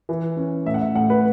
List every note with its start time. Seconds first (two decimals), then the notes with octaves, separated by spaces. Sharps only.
0.09 E3
0.37 C#4
0.66 A2 E5
0.74 F#5
0.81 E5
0.95 A2 F#5
1.10 B4